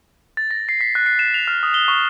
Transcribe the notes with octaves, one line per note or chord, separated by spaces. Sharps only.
A6
A#6
C7
B6
F#6
C7
E7
F7
F6
D#6
G7
C#6